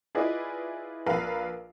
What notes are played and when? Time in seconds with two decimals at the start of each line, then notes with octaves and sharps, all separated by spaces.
0.15 E4 F4 G#4 B4 D5 D#5
1.06 A#1 A#4 B4 F5